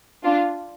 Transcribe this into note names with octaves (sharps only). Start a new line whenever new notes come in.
D4 F4